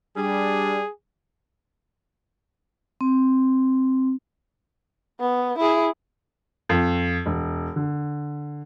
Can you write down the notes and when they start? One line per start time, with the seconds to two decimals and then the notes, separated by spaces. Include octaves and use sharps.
0.17 G3 D4 G#4
3.01 C4
5.20 B3
5.58 E4 G#4
6.69 F2
7.26 E1
7.76 D3